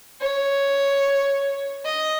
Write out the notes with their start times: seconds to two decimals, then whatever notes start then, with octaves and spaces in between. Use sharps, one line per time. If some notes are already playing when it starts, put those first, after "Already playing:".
0.20 C#5
1.85 D#5